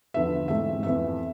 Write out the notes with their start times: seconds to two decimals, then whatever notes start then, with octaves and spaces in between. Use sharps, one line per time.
0.14 E2 D3 F3 B3 E5
0.48 G#2 E3 A3 C4 E5
0.83 F2 E3 B3 E5